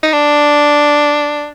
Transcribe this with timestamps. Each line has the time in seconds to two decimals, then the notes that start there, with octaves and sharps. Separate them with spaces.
0.03 D#4
0.13 D4